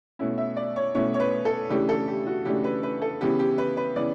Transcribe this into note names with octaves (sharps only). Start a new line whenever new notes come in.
B2 A3 C#4 E4
E5
D5
C#5
B2 A3 C#4 E4 C#5
C#5
B4
A4
C#3 E3 A3 D4 G4
A4
G4
F#4
C#3 E3 A3 D4 G4
B4
B4
A4
C#3 E3 B3 G4
G4
B4
B4
C#3 E3 B3 D5